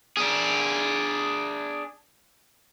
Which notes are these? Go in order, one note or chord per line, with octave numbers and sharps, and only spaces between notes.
D4 G#4